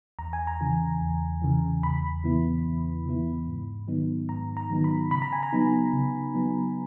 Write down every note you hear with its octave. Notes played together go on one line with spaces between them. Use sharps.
E2 A#5
G#5
A#5
C#3 E3
E2
C#3 E3
E2 B5
C#3 E3 B3 E4
E2
C#3 E3 B3 E4
G#2
D#3 F#3 B3 D#4
G#2 A#5
A#5
D#3 F#3 B3 D#4
B5
C#3 B5
A#5
G#5
A#5
F#3 B3 D#4
C#3
F#3 B3 D#4